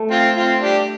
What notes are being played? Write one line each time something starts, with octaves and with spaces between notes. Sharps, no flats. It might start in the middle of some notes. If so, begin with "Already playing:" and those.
Already playing: A3
C4 F4
C4 F4
D4 G4